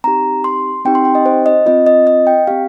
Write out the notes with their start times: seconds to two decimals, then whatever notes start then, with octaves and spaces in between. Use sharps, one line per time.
0.04 C4 D#4 G4 A#5
0.44 C6
0.85 C4 D#4 G4 G5
0.95 C6
1.05 G5
1.15 D#5
1.26 C5
1.46 D#5
1.66 C4 F4 D#5
1.87 D#5
2.07 D#5
2.27 G5
2.47 C4 G4 F5